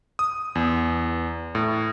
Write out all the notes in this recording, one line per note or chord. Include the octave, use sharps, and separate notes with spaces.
D#6
E2
A2